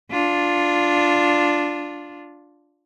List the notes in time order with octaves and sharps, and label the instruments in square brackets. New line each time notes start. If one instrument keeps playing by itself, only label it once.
[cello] D4 F4